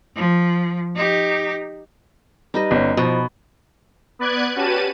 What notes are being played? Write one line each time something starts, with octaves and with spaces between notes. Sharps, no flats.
F3
D#4 G4
G3 D#4 B4 D#5
G1 C#4
B2 F3
B3 B4 D5 F#6 G#6
C#4 F#4 G4 B4 A5 D#7